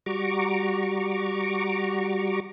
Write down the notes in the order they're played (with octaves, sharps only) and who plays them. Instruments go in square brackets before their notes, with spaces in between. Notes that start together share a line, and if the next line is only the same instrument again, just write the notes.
[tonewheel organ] G3 F#4 A#5 C#6 D6